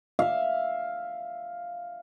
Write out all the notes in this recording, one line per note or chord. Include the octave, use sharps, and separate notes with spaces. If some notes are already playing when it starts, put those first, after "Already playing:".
E5 F5